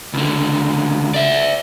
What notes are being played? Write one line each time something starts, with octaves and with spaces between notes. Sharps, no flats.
C#2 D3
D5 E5